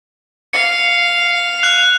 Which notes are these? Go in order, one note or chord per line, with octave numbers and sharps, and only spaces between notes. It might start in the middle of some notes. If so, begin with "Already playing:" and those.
F5 C#7
F#6 F7